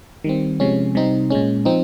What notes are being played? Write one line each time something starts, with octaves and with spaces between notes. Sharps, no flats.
D#3 G3 C4
C3 F3 G#3 C#4
C3 G3 C4 D#4
A#2 G#3 C#4
F3 C4 D#4